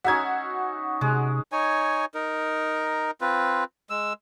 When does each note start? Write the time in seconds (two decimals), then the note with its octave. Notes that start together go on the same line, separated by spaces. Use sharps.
0.04 C#4 D#4 F#4 E5 G#6
1.01 C3 G#3
1.52 D#4 C#5 G#5
2.14 D#4 A#4
3.21 C4 F4 B4
3.90 G#3 E6